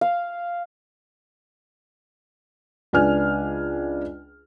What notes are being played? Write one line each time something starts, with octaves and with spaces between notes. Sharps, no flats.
F5
C#2 D4 B4 G#5 F6